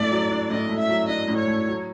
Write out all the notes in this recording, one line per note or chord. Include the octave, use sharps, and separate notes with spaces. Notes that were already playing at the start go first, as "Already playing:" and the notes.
Already playing: A2 A3 D4 D5
F#3
D4
A2 D#5
A3
E5
F#3
D4 D#5
A2
C#5
A3
F#3